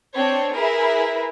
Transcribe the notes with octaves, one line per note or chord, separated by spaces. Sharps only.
C4 D4 C#5
E4 G#4 A#4 B4 E5